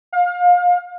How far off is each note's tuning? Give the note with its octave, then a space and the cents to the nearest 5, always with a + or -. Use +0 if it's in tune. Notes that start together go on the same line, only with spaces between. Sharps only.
F5 +30